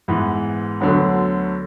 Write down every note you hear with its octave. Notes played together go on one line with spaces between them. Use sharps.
G#2 E3 B3
D2 D3 F#3 B3